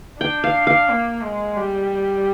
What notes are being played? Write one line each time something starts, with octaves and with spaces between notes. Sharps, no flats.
D4 G5
F5
F5
A#3
G#3
G3